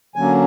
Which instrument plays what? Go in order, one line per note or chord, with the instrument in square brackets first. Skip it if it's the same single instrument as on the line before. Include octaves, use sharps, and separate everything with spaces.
[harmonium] D3 F#3 A#3 C#4 G#5